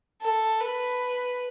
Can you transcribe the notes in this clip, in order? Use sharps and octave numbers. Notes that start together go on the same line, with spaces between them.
A4
B4